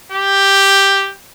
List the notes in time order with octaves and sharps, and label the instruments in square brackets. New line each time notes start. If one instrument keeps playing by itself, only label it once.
[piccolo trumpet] G4